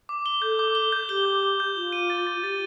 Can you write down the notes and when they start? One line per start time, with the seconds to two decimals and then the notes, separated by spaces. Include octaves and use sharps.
0.09 D6
0.26 G7
0.42 A4 G6
0.59 D6
0.75 G7
0.92 G6
1.09 G4 G7
1.25 G6
1.43 G6
1.60 G6
1.76 F4 G7
1.92 D#7
2.10 A6
2.27 A6
2.35 F4
2.43 G4 A6